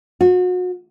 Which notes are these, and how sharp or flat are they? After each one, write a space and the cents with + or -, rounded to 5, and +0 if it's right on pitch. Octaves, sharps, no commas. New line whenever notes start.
F#4 -35